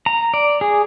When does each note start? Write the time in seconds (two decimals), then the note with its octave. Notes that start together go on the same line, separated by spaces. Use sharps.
0.06 A#5
0.34 D5
0.61 G#4